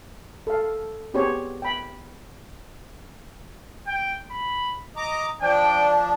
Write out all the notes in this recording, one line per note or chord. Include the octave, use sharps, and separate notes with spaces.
A4 F5
B3 C4 G4 G#4 C5 C#5
G5 B5
G5
B5
D#5 A#5 D6
F3 D4 G5